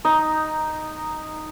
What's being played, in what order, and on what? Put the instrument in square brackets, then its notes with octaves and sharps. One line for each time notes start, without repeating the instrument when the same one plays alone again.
[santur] D#4 D#5